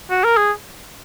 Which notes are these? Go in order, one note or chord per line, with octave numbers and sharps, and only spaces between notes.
F#4
A#4
G#4